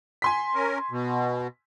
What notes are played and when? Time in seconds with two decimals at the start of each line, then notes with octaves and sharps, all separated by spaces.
0.22 G#5 C6 B6
0.55 C#4 A#4
0.91 B2